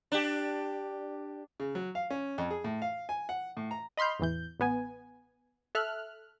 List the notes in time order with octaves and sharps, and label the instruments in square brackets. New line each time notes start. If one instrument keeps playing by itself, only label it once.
[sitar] D4 G4
[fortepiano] C#3
F#3
F5
C#4
F2
G#4
A2
F5
G#5
F#5
A2
A#5
[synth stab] D#5 B5 C6 F6 G6
A1 E2 E3 G6
A1 B3 G#5
A4 E5 F6 F#6